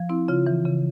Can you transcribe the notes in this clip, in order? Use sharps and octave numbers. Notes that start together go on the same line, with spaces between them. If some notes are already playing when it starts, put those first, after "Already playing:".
Already playing: F3
C4 E4
C#3 F4
E3
C#3